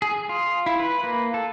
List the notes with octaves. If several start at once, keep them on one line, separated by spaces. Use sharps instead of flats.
G#4
F4
E4
B4
A#3
A4